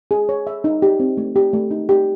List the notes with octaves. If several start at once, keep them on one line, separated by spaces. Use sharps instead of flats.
G#4
C#5
E5
D#4
G4
C4
A3
G4
A3
D#4
G4